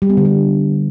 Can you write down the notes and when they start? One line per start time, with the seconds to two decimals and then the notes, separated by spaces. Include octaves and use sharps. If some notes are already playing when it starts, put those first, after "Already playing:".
0.02 G3
0.10 B3
0.17 D3
0.25 G3